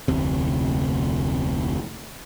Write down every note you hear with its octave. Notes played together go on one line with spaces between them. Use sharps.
F1 D2 C3